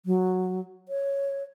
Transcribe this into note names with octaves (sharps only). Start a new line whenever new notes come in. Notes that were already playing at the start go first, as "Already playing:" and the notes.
F#3
C#5